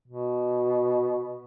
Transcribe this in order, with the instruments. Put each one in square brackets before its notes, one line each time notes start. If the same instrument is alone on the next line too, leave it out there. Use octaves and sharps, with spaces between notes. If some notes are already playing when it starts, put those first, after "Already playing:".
[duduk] B2